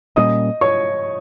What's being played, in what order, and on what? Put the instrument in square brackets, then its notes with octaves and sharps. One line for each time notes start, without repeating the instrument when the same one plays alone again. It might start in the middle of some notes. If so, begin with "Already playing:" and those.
[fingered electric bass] A#2 G3 A#3 C#4 [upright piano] D#5 D#6
[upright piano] C#5 C#6